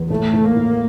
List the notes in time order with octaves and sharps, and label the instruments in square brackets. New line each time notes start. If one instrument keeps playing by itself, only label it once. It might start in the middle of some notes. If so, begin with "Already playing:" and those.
Already playing: [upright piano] E2
[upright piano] A2 [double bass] A3
[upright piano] A2
[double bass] A#3
[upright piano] A2